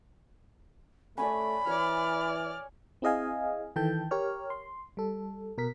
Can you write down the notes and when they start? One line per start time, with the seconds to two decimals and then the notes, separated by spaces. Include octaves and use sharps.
1.18 A3 C#4 D5 B5
1.67 E3 C#5 D5 F6
3.02 C4 E4 G#4 D#5 F5 G#5
3.76 D#3 E3 A4 G5 A5 G6
4.11 G4 A#4 C#5 F6
4.50 C6
4.97 G3 A4
5.58 B2 A#4 B6